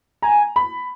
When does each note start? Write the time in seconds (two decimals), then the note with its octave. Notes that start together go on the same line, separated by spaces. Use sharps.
0.22 G#5 A#5
0.56 B5